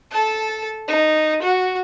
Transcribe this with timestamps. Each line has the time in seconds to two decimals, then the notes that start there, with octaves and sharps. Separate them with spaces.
0.11 A4 A5
0.88 D#4
1.42 F#4